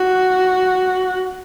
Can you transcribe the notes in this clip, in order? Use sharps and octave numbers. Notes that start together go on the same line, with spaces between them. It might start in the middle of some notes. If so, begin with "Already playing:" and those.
Already playing: F#4